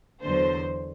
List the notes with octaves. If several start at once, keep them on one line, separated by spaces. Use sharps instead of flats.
E2 D3 F#3 C5